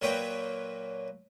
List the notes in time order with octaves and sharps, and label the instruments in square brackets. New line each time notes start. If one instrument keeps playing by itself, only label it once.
[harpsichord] A#2 F#3 A#3 B4 C#5 G5